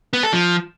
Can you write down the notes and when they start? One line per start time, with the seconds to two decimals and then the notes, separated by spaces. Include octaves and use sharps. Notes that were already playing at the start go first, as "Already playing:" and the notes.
0.13 B3
0.23 A4
0.33 F3